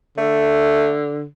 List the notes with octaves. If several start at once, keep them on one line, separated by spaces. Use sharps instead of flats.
D3 A3